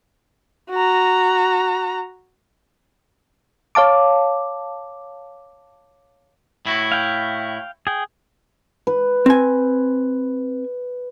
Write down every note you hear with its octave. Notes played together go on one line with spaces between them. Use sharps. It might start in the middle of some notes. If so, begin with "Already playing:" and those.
F#4 A#5
C#5 F5 A5 D6
A2 E4 F#4
F5 G5
G#4 G5
B4
C4 G#5